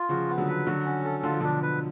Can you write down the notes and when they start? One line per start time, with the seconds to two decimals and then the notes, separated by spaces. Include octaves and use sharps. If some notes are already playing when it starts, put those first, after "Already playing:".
Already playing: F4
0.09 C#3 F3 F#4
0.29 B3
0.38 D3 F#3
0.48 B4
0.66 D3 F#3 F#4
0.85 C#4
1.04 A4
1.23 D3 F4
1.32 F3
1.40 B2 D3 D4
1.62 B4